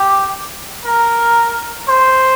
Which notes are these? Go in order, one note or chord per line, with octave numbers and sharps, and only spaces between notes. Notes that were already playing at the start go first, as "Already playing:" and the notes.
Already playing: G4
A#4
C5